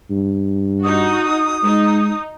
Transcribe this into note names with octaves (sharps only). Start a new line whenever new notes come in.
G2
D#4 F#4 D#6
G#3 D#4